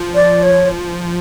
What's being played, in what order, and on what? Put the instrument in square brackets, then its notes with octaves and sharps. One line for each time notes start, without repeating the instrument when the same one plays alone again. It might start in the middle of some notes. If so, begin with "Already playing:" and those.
Already playing: [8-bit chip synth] F3
[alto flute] D5
C#5